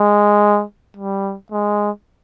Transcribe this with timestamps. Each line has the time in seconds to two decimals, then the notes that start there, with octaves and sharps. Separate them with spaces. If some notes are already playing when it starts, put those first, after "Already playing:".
Already playing: G#3
0.97 G3
1.52 G#3